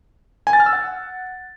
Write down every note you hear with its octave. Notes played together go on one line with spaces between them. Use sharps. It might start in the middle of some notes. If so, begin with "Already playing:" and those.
G#5
A6
F6
E6
F#5